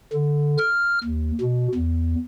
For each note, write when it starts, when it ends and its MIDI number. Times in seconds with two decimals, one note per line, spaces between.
0.13 0.57 50
0.58 0.99 89
1.03 1.31 39
1.41 1.68 47
1.74 2.15 40